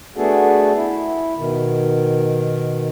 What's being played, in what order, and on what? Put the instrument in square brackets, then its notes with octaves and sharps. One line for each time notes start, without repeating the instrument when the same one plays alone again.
[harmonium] A3 B3 D4 F#4 G#4 A4
E4
B2 D#3